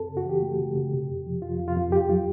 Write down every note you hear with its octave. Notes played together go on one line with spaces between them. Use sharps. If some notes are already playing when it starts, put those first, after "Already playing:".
Already playing: F#2 C4 A4
C#3
F#4
E3 G4
A3
C#3
C#3
C3
F2
F3
F2 F4
F2
F4
F2
F2 G4
F#3 F4